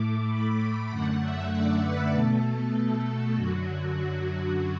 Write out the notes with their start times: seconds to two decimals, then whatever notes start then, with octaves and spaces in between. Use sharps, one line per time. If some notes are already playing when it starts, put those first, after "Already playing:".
Already playing: A2 A3 D6
0.29 B5
0.90 F#2 D3 A3 F#5
1.21 E5
1.51 D5
1.82 B4
2.12 B2 A3 A4
2.43 A4
3.35 F#2 D3 F#3 F#4
3.66 F#4
3.96 F#4